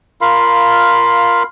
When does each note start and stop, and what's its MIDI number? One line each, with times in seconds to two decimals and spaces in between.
0.21 1.43 65
0.21 1.43 70
0.21 1.43 77
0.21 1.43 83